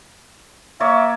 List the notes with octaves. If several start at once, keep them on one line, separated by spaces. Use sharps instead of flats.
A#3 C#5 D5 E5